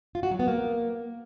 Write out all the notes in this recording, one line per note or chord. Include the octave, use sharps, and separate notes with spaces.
F4
F#4
F#3
B3
A#3